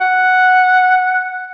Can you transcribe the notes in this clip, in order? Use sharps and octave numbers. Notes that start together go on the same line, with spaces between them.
F#5